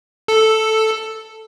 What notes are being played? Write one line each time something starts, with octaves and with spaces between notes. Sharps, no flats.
A4